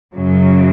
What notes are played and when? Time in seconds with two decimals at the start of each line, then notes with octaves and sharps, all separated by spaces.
0.14 F#2 C#3 F#3